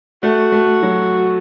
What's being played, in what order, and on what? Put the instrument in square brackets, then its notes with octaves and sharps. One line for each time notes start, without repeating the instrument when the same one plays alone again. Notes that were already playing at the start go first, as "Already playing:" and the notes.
[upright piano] A3 [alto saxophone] F#4
[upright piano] A3
F#3